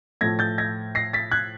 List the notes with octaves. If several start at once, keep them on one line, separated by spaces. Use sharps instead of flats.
A2 F3 A3 G#6 A#6
G6 A6
G#6 A#6
A#6 C7
A6 B6
F#6 G#6